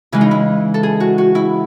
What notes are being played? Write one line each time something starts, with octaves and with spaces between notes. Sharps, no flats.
C#3 E3 G#3 E4
D#4
E4
A4
G#4
F#4
F#4
E4